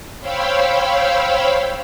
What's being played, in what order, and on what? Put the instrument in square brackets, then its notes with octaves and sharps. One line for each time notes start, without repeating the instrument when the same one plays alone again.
[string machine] C5 C#5 F5 G5 B5 E6